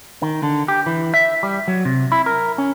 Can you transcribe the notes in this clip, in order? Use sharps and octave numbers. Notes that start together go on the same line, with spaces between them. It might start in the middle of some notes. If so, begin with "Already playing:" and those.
D#3
D3
G4
E3
E5
G3
F#3
C3
E4
A#4
C#4